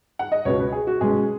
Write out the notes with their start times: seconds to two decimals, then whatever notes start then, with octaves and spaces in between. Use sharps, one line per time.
0.19 F#5
0.32 D#5
0.45 C#2 B2 B3 C#5
0.59 B4
0.72 G#4
0.87 F#4
1.01 B2 G#3 C#4 G#4